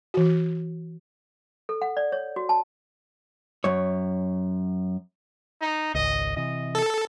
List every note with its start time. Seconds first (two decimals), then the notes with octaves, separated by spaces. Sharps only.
0.14 E3 F#4
1.69 A4
1.82 F#5
1.97 D5
2.12 C#5
2.36 F#4
2.49 A5
3.64 F#2 C#5
5.61 D#4
5.95 G#1 C#2 D#5
6.37 C3 E3 D#5
6.75 A4